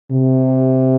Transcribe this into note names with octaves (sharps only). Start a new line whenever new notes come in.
C3